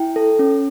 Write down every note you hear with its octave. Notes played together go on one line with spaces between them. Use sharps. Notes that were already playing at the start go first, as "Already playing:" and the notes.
Already playing: E4 G5
A4
C#4